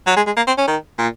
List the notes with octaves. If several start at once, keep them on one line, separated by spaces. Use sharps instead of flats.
F#3
G#3
G#3
A#3
C4
C#4
D#3
A#2